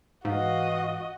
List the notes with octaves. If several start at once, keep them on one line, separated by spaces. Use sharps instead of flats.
G#2 E3 F#4 D#5 F5